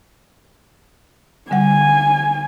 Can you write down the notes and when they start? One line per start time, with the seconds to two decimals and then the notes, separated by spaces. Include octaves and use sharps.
1.51 D3 G3 F#5 G#5